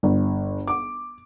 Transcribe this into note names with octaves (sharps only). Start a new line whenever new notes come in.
G1
D6